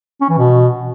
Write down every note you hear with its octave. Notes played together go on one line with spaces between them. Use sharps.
C#4
E3
B2